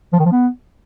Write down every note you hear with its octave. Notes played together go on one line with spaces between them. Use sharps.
F3
D#3
F3
B3